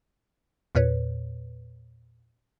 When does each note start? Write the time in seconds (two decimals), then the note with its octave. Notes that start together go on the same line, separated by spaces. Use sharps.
0.75 E2 A#2 B4 C#5